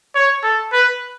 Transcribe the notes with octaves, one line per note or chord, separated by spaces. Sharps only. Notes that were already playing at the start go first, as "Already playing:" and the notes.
C#5
A4
B4